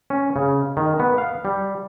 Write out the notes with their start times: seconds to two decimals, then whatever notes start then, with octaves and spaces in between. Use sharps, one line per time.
0.10 C#4
0.36 C#3
0.77 D#3
1.00 B3
1.18 F5
1.45 G3